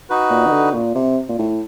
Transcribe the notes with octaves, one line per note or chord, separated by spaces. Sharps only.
D#4 F#4 B4
A#2
D#3
D3
A#2
C3
A#2
A2